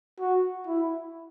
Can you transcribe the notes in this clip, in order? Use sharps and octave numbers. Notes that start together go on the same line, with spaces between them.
F#4
E4